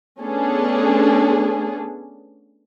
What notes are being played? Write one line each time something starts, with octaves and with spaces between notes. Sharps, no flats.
A3 B3 C#4 D4 G#4 A4